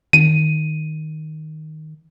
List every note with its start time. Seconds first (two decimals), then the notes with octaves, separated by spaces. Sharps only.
0.13 D#3 D#7